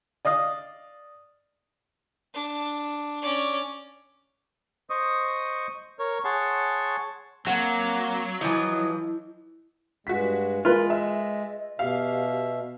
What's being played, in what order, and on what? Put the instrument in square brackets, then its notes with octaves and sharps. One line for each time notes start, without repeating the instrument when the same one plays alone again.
[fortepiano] D5 D#5 F5 D#6
[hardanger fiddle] D4
C#4 D5
[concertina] C5 D#5 C#6 D#6
A#4 C#5
G#4 C#5 F#5 A5 C6
[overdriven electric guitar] F#3 [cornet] A#3 [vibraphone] C4 [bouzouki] F#5
[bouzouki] E3 F3 [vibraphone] E4 [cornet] D#5
[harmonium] G2 G#3 [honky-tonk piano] F#4 B6
[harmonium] G#3 [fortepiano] F4 B4 [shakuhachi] A#4
[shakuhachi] D#5 [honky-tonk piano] E5
[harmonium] B2 E5 [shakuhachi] G4 [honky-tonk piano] F5